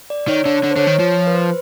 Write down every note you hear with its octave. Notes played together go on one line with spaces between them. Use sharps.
D5
D#3 C#5
D3 C#5
D3 C#5
C5
D3 C#5
D#3
F3
B4
C5